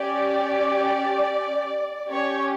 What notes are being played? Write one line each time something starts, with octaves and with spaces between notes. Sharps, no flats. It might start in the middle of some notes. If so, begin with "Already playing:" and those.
Already playing: C#4 G4 D5
C#4 G4 C#5